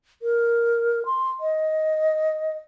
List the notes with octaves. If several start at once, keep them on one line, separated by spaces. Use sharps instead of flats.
A#4
C6
D#5